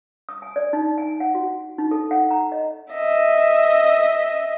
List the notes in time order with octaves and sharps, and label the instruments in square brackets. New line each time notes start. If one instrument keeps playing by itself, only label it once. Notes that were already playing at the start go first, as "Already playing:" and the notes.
[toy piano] D#6
G#5
D5
D#4
G#5
F#5
F#4
D#4
A4
F#5
A#5
D#5
[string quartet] D#5 E5